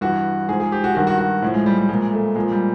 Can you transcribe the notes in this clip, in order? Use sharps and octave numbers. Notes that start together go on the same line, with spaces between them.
G2 E3 F#4
G#2 F3 G#4
G#4
G4
F#4
G2 D#3 F#4
F#4
F#4
A2 F3
G#3
G3
G3
A#2 F3 G#3
A3
A#2 F3 G#3
G3